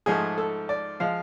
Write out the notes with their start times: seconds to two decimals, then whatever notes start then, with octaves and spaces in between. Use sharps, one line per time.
0.06 G#2 F3 A3 G#4
0.38 A4
0.69 D5
1.00 F3 G#3 F5